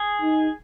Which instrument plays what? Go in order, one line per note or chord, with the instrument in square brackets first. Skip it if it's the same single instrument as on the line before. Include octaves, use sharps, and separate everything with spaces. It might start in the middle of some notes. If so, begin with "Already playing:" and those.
Already playing: [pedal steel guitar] G#4
[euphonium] D#4